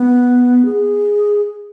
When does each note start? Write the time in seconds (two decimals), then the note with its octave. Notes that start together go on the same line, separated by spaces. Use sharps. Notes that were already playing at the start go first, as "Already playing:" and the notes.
Already playing: B3
0.65 G#4